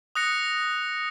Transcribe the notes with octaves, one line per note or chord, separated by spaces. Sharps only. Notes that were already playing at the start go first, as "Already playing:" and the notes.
D#6 F#6 A#6 C#7